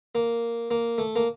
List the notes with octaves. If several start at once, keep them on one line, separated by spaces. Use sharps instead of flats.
A#3
A#3
A3
A#3